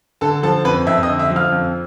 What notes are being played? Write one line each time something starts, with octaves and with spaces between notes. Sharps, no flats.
D3 A4 A5
F3 A4 A5
F2 B4 B5
F2 E5 E6
E6
D#5 D#6
D3
E5 E6
F3
F5 F6
F2